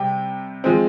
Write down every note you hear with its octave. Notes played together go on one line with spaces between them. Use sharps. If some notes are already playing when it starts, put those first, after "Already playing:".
Already playing: C3 G3 G5
F3 G#3 C4